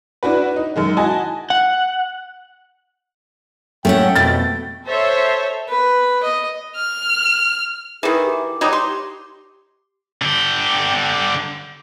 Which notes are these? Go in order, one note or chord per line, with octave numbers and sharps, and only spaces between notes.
D4 E4 F#4 B4
D#4
F#2 D#3 G#3
E4 F#4 D#5 G#5 A5
F#5
A2 A3 C#4 F#5 G5
F2 B2 A6
A4 C5 C#5 E5
B4
D#5
F6
D#3 E3 G#4
G4
F#3 G3 D#4
C6
D3 G4